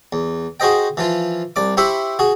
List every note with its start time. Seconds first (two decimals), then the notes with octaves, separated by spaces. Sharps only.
0.13 E2
0.60 F#4 G#4 C5 D#5 G5
0.97 E3 F3 F4
1.56 C2 D5 D6
1.77 E4 G4 C5 E5 B5 C#6
2.19 F#4 G#4